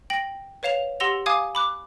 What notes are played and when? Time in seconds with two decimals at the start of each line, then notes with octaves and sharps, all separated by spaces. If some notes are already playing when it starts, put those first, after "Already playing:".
0.10 G5 A#6 F#7
0.63 B4 C#5 F5 E7 F7
1.00 G4 F#5 C6 E6 A#6 F7
1.26 F5 G#5 D6 D#6 G#6
1.55 B5 D6 F#6